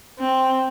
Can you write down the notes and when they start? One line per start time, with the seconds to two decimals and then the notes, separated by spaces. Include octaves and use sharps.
0.19 C4